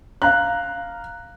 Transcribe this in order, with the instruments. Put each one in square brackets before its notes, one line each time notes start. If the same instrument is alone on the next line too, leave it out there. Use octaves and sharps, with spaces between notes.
[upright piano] F5 A#5 F#6